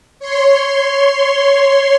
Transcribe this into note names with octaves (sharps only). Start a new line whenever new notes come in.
C#5 C6